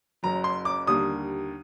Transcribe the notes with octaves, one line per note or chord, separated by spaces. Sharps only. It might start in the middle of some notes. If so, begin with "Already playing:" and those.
F#1 F#2 F#3 A#5
C6
D6
D#2 D3 G3 A#3 D#6